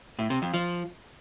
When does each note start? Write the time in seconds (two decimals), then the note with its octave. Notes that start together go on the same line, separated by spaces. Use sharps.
0.19 A2
0.30 C3
0.42 F2
0.54 F3